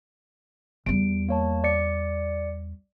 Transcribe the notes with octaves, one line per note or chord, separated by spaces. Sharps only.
E2 G3 D7
A#3 C#5 A5
D5 C#7